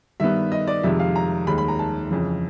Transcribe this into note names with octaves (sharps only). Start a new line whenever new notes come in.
G2 D#3 G3 B3 E5
D#5
D5
F2 C3 D#3 G#3 E5
F5
A#5
D#2 D#3 G#3 B5
B5
A#5
A5
F2 C#3 E3